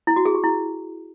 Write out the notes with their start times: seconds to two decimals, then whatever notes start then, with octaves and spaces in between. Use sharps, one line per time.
0.07 E4
0.16 F#4
0.25 G#4
0.35 G4
0.44 E4